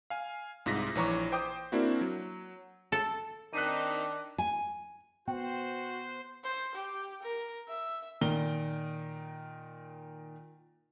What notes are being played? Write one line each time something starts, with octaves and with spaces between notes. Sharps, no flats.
F5 G#5
C2 G#2 F4 A#6 B6
A#1 E3 C#5 A#5 C#6 D6
C5 G5 D6 D#6 G6
A#3 C4 D4 E4 F#4
F#3
A4
D#3 C4 D4 D#4 F#6 B6 D#7
G#5
B3 F#4 C5 G5
C5
G4
A#4
E5
A#2 D#3 G7